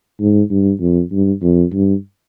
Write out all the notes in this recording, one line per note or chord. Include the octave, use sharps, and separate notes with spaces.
G#2
G2
F2
G2
F2
G2